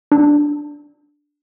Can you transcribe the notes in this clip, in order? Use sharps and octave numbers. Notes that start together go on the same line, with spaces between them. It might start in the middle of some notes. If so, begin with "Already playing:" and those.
D4